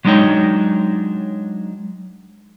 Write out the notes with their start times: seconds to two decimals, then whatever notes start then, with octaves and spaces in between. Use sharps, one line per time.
0.05 F#3 G#3 D4 D#4 C#5 G5